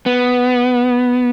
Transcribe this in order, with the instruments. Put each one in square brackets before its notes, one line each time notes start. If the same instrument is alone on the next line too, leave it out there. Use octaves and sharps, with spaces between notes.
[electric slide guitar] B3